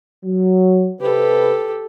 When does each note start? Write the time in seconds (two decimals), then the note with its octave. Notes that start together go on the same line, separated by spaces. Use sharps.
0.24 F#3
1.00 C3 G4 A4 B4